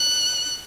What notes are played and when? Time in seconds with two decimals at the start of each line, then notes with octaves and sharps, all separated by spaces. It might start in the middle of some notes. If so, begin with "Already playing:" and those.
Already playing: F#6